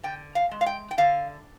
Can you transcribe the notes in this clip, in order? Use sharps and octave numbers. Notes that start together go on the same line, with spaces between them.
D3 G5
F5
G#3
F5
G5
G5
D3 F5